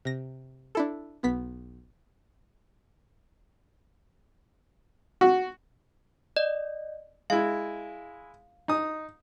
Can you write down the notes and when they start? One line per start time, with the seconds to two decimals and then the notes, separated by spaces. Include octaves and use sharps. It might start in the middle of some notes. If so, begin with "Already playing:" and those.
0.05 C3 A#6
0.75 D4 E4 A4
1.23 B1 B3 B6
5.21 F#4
6.36 D5 D#5
7.30 G#3 E4 F5
8.68 D#4 D#6